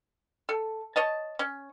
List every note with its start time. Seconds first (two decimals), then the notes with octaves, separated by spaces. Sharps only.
0.49 A4
0.96 C#5 D#5 A5
1.39 C#4